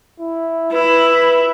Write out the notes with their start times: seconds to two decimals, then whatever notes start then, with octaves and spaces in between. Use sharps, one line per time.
0.20 E4
0.73 E4 B4